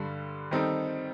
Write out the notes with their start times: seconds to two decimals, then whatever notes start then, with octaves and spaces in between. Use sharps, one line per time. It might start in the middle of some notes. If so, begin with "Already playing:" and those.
Already playing: G2 D3 G3
0.51 D#3 G3 C4 D#4 A4